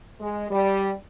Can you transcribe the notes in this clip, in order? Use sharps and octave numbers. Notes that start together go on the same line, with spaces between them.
G#3
G3